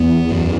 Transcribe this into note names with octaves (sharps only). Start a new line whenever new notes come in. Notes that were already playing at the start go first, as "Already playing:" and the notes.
Already playing: E2 B3
F#2